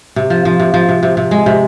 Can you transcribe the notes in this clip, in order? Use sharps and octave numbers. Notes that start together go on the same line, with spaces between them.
C3
F3
F3
C3
F3
C3
C3
C3
G#3
C3